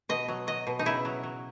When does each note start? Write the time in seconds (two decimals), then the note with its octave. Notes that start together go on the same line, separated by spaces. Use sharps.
0.09 B2 D#5
0.28 F#3
0.47 F#3 D#5
0.67 B2
0.79 D#4
0.86 C#3 E4
1.05 F#3
1.23 F#3